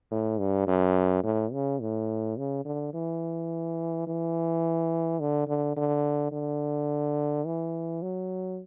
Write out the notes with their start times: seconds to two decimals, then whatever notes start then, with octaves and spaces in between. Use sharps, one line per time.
0.11 A2
0.40 G2
0.67 F#2
1.24 A2
1.53 C#3
1.81 A2
2.38 C#3
2.65 D3
2.94 E3
4.07 E3
5.20 D3
5.48 D3
5.76 D3
6.32 D3
7.46 E3
8.02 F#3